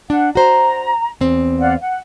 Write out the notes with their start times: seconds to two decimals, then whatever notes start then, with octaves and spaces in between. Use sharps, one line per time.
0.10 D4 F#5
0.35 F#4 C5 A#5
1.21 E2 C4
1.59 D5 F5 F#5
1.81 F#5